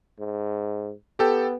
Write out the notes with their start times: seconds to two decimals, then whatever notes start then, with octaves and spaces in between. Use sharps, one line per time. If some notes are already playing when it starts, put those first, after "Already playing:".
0.19 G#2
1.19 B3 G4 A4 G5